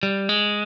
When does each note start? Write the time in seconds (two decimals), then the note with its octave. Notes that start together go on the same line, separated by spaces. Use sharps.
0.03 G3
0.29 G#3